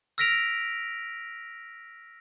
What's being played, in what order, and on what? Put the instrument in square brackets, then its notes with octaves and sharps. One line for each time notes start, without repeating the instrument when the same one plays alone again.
[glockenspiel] E6 F6 A#6 B6 D7 F7